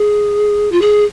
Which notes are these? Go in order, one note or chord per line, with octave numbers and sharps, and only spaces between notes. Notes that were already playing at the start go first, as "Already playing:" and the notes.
Already playing: G#4
F4
G#4